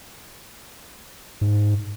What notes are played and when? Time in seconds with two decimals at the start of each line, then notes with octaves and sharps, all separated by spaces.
1.41 G#2